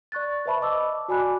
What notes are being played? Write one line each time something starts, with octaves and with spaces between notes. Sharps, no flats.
D5 C#6 F#6 A6
B4 C5 E5 A5 B5 C#6
D#5 A5 D6 E6
F#4 D5 G#5 B5 D6 F#6